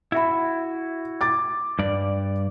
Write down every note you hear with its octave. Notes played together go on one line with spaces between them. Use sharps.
E4 F#4 E5 B5
D6 A6
G2 D5